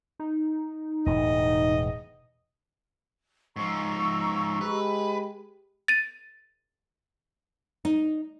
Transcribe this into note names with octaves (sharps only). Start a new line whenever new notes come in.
D#4
E1 A2 C#3 D#5
G#2 F3 A#5 C#6 E6
G#3 G4 B4
A6 D#7
D#4